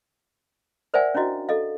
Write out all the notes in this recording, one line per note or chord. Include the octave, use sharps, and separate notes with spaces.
A#4 C5 D5 E5 F#5 G#5
C#4 D4 E4 F#4 D#5
A4 D#5 F5